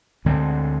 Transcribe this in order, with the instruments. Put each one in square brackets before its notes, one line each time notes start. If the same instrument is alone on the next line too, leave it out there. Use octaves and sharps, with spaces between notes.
[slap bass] D2 D3 G#3 C4